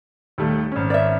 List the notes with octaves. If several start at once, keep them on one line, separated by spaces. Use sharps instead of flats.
D#2 G3 A3
G#1 C#4
D5 E5